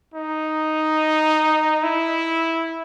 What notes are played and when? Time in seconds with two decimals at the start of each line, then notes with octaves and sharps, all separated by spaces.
0.14 D#4
1.83 E4